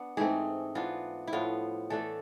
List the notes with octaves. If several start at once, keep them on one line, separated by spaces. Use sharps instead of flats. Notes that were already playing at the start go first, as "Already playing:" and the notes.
Already playing: B3 D4
G#2 E3 A3 C4 G#4
E3 B3 D4 F4
E4
A2 F3 B3 F4
E3 A3 D4 A4